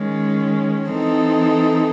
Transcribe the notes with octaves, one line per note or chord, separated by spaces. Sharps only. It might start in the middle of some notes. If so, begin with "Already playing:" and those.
Already playing: D#3 G#3 C#4
E3 C4 D#4 A4